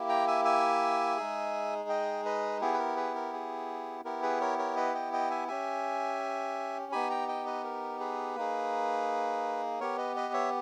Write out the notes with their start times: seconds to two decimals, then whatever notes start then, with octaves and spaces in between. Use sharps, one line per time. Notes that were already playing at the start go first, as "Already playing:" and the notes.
Already playing: A#3 E4 G4
0.09 G5 A#5
0.27 E5 G#5
0.45 E5 G#5
1.17 G#3 D#4 G#4
1.89 D#5 G5
2.25 B4 D#5
2.61 B3 E4 G4 G#4
2.74 B4
2.79 A#4
2.96 G#4 B4
3.15 A#4
3.33 G#4
4.05 B3 E4 G4 A#4
4.23 G#4 B4
4.41 A#4 C#5
4.59 A#4 C#5
4.76 B4 D#5
4.94 D#5 G5
5.13 D#5 G5
5.31 E5 G#5
5.48 C#4 G4 E5 G#5
6.92 B3 D#4 G4 G#5 B5
7.10 G5 A#5
7.28 D#5 G5
7.46 B4 D#5
7.64 A#4
8.00 G#4 B4
8.36 A#3 D#4 G#4
9.80 B3 G4 A#4 C#5
9.98 B4 D#5
10.16 B4 D#5
10.34 C#5 E5